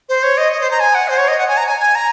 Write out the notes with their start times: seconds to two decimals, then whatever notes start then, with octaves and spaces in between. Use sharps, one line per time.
0.09 C5
0.23 C#5
0.37 D#5
0.52 D#5
0.61 C5
0.71 A#5
0.80 G#5
0.95 F#5
1.08 C5
1.18 C#5
1.28 D#5
1.38 F#5
1.48 G#5
1.57 A#5
1.66 G#5
1.80 G#5
1.95 A#5